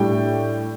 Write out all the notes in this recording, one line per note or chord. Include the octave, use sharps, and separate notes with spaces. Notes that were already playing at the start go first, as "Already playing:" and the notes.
Already playing: A2 G3 D4 D5 G5